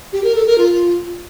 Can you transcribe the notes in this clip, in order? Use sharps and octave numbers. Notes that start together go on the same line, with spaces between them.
G4
A#4
A4
A#4
F4